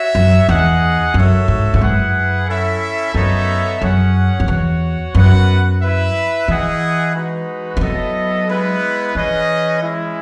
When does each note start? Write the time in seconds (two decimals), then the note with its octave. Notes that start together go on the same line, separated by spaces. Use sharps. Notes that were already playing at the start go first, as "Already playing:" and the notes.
Already playing: F#4 C#5 E5
0.15 F#2
0.48 E2 D#4 G#4 D#5 F#5
1.14 F#2 F#4 A4 C#5 E5
1.48 G#2
1.74 G#2
1.81 F#2 E4 G#4 B4 F#5
2.48 C#4 E4 A4 E5
3.14 F#2 B3 D#4 A4 C#5 E5
3.81 F#2 C#4 G#4 C#5 F#5
4.40 F#2
4.48 E2 F#4 C#5 F#5
5.14 F#2 B3 F#4 B4 F#5
5.82 E4 B4 E5
6.48 E3 E4 G#4 D#5 F#5
7.14 G#3 D#4 F#4 B4
7.77 E3
7.81 F#3 B3 E4 A4 D#5
8.48 G#3 B3 E4 B4
9.14 E3 C#4 G#4 B4 D#5
9.81 G#3 C#4 E4